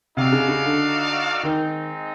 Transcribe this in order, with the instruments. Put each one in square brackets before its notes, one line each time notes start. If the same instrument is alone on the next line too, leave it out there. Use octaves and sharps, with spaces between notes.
[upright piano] C3 [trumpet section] D#4 F#4 A4 D5 F5
[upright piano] C#3
C#3
D3
[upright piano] D#3 [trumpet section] G#3 C4 D#4